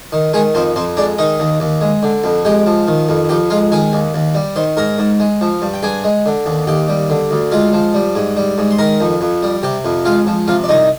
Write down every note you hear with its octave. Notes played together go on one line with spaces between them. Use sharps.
D#3
D#3 G#3 G#4
F2 C4 C5
F2 C4 C5
G#3 D4 D5
D#3 D#4 D#5
D#2
D#2
G#3
D3
F2
G#3 G4 G5
F3
D#3
F2
F2 G4 G5
G#3 F4 F5
D#3 G#4 G#5
D#2
D#2
G3
D#3 C5 C6
G#2 A#4 A#5
G#2
G#3
F3
G2
G5
G2 G#4 G#5
G#3
D3
D#2
D#2 G4 G5
G3
D3
D2
G#3 F4 F5
F3
G3
G#2
G3
G#2
C6
D#3 A#4 A#5
F2
F2
G3
C3 G4 G5
F2
G#3 F4 F5
F3
C3 F4 F5
D5
C2 D#4 D#5